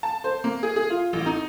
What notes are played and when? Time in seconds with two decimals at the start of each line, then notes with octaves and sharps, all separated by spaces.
0.03 A5
0.24 C5
0.44 A#3
0.63 G#4
0.76 G#4
0.90 F4
1.13 A1
1.26 D#4